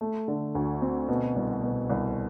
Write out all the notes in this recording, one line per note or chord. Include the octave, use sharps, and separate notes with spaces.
A3
D3
D2
C4
B2
C2
B2
C2